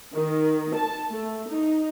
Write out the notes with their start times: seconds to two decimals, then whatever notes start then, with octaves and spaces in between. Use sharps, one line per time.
0.15 D#3
0.75 A5
1.09 A3
1.49 D#4